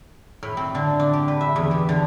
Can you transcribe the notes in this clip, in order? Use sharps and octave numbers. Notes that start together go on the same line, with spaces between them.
A2
C4
D3
D4
G4
B4
E5
E2
G4
D3